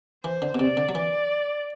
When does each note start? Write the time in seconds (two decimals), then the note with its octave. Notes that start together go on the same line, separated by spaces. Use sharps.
0.24 E3 C5
0.42 D3
0.55 B2
0.59 C3 D5
0.77 D3
0.89 F#3
0.94 E3 D5